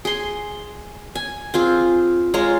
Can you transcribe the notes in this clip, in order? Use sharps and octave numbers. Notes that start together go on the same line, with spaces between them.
G#4 C6
G#5
C4 F4 G#4
G#3 F4 C#5 A#5